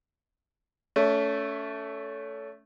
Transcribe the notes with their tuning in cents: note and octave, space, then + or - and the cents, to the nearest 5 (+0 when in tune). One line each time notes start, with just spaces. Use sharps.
A3 +0 C#4 +30